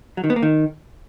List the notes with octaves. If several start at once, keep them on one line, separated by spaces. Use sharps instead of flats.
F#3
D#3
B3
A#3
D#3